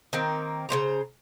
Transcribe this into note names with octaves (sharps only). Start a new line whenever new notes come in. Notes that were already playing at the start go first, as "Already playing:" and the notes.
D#3 A#3 C4
C#3 B3 C5 A#5